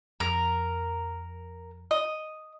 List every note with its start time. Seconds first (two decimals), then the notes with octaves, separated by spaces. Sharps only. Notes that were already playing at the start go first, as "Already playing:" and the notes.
0.20 F2 A#4
1.91 D#5